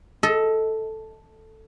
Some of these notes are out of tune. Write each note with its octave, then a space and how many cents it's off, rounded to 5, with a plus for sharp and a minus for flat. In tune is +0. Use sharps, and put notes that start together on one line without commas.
A4 +0 D#5 +25